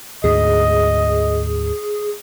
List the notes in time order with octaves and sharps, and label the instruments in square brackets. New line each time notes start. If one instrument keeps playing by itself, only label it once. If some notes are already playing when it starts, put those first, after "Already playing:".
[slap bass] D2 G#2 [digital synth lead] G#4 [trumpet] D#5